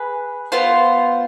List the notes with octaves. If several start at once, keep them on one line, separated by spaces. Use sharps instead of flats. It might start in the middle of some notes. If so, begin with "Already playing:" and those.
Already playing: G#4 B4
B3 F4 C5